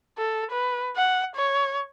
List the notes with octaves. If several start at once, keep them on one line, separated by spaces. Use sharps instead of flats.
A4
B4
F#5
C#5